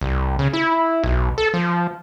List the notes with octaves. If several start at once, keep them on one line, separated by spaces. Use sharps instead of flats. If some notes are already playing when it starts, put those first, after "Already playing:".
C2
C#3
E4
B1
A4
F3